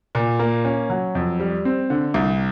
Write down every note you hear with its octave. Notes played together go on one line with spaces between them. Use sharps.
A#2
A#3
C#4
F#3
F2
G3
C4
D3
C2